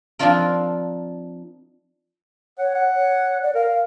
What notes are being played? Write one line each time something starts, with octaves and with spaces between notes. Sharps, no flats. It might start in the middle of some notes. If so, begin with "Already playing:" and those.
F3 C4 D4 D#4 F4 A#4
C#5 F#5
F#5
C#5
D5
A#4 F5